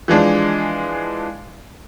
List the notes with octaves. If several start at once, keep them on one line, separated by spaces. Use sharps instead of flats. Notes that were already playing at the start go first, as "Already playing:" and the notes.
E3 F3 G#3 D4